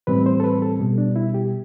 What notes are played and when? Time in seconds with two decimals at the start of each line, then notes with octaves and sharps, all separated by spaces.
0.07 A2 E3 G3 C4 B4
0.26 C5
0.40 A4
0.44 B4
0.62 A4
0.80 B2 G3 B3
0.98 D4
1.16 E4
1.34 G4